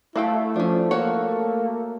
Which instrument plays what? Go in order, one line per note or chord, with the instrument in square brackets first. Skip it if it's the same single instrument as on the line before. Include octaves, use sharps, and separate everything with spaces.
[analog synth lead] A3 [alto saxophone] E4 [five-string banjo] F#4 F5 G5
[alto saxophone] F3 [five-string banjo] C#4 D4
[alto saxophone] A#3 [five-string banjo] F#4 C#5